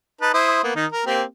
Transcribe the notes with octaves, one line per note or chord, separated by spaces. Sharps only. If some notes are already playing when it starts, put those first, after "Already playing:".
D#4 B4 A5
E4 C5 D#6
A#3 B3
D#3 D#4
A#4
A#3 C4 G4